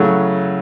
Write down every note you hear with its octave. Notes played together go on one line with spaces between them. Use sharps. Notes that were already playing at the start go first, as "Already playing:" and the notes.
Already playing: C#3 F#3 A3 E4 F#5